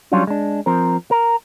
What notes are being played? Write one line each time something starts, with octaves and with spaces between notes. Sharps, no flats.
F#3 G3 C#4 D4 F4
G#3 D4
F3 C4 A#4
A#4